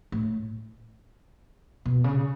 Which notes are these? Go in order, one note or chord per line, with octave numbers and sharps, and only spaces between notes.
A2
B2
C#3